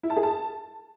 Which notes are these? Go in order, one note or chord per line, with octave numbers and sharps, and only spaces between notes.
E4
A5
G#4
A5